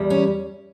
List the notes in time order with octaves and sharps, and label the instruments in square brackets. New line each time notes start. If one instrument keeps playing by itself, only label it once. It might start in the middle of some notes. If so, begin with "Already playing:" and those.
Already playing: [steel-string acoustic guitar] E2 G3
C#4